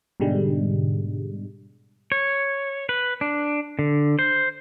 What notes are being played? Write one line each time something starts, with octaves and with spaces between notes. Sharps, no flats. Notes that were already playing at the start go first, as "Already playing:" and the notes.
G#2 B2 D3 G3 G#3
C#5
B4
D4
D3
C5